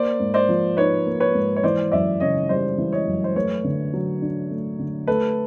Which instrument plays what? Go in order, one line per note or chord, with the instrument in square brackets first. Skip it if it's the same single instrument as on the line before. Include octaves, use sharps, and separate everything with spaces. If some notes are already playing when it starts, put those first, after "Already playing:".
Already playing: [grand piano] A#3 [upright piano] C5 D5
[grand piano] G#2
[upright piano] C5 D5
[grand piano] F3
[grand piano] D#4 [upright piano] B4 C#5
[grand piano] A#3
[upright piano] B4 C#5
[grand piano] G#2
[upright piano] C#5
[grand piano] E3 [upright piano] C5 D5
[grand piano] F#2 [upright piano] D5 E5
[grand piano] C#3 [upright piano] C#5 D#5
[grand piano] G3 [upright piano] C5 D5
[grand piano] E3
[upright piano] C#5 D#5
[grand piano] F#2
[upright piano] C5
[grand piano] A3 [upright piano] B4 C#5
[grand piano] D3
F#3
D4
A3
D3
[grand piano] A3 [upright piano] A4 B4